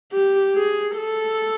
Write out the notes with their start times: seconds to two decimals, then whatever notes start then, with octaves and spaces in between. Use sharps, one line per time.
0.12 G4
0.55 G#4
0.97 A4